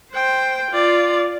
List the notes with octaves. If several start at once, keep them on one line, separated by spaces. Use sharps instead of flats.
C5 G5
F4 D5